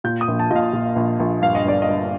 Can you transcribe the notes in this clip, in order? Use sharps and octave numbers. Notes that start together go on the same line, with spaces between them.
A#2 G6
D#6
A#1
A5
A#2 D#5
F5
A#2
A#1
A#1
G2 F5
D#5
G1 D5
D#5
G1